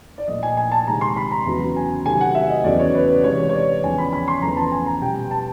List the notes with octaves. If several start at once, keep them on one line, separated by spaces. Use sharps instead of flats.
D5
A#2 F3 A3 D#5
G#5
G#5
A5
C3 D#3 G#3 A#5
C6
B5
A#5
E2 C#3 F#3
G#5
C3 D#3 F#3 A3 G#5
F#5
E5
D#5
E2 C#3 F#3 A3 D5
C#5
B4
C3 E3 G#3 C#5
C#5
D5
E2 C#3 F3 G#5
B5
B5
C6
E2 C#3 F3 A3 A#5
A5
G#5
A#5
B2 G3 G5
A5